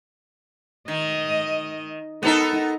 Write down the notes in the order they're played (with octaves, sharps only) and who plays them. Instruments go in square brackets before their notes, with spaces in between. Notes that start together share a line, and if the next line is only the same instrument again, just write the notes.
[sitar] D#3 [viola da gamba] D#5
[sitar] B3 A4 A#4 [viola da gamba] D#4